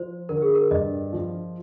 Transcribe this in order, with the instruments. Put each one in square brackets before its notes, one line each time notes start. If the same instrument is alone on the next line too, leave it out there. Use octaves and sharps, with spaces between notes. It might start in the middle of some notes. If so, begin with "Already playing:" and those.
Already playing: [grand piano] F3 [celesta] C5
[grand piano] D3 [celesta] A#4
[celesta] G#4
A#4
[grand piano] G2 [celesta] D#5
[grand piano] F3